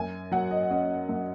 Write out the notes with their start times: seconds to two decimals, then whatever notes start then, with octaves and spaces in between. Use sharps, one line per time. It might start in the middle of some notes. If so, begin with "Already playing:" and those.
Already playing: F#2 G#5
0.32 F#3 F#5
0.51 D#5
0.71 C#4 D#5
1.09 F#2